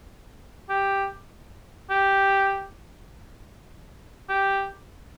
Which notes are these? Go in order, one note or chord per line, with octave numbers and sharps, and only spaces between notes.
G4
G4
G4